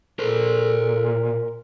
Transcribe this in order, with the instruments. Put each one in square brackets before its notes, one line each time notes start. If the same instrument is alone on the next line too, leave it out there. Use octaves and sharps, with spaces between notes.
[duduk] A#2 [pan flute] A4 [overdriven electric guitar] A#4 C5